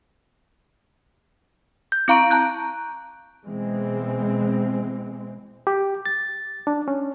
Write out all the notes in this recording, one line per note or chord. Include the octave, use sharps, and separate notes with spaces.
G6
C4 E4 F5 A#5 C#6 D7
A5 A#5 F#6 G6
B2 E3 G#3 C4
G4
A6
D4
C#4